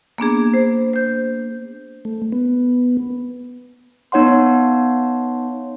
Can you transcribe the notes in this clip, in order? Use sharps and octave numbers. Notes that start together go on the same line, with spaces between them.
A#3 B3 D4 G#4
C5
C5 G6
A3
B3
B3 D#4 C#5 F#5 C6